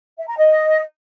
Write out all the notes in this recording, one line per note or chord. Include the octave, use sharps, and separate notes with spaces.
E5
A#5
D#5